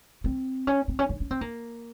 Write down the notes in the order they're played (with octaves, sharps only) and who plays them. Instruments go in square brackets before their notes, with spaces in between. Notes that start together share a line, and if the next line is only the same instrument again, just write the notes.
[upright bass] C4
C#4
C4
C#4
C#4
C#4
C4
A#3